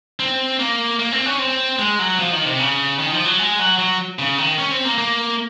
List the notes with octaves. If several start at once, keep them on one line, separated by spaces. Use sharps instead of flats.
C4
A#3
A#3
C4
C#4
C4
G#3
F#3
F3
D#3
C3
C#3
D#3
F3
F#3
G#3
F#3
F#3
C#3
D#3
C#4
C4
A#3
A#3